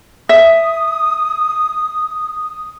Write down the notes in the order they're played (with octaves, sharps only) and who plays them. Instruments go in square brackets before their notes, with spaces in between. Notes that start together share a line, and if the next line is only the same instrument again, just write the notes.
[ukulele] E5 [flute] D#6